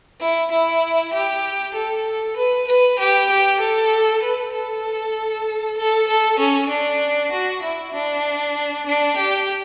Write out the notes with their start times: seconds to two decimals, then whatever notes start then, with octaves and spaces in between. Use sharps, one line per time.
0.20 E4
0.50 E4
1.13 G4
1.74 A4
2.36 B4
2.67 B4
2.98 G4
3.30 G4
3.59 A4
4.22 B4
4.53 A4
5.76 A4
6.08 A4
6.38 C#4
6.68 D4
7.31 F#4
7.62 E4
7.93 D4
8.86 D4
9.16 G4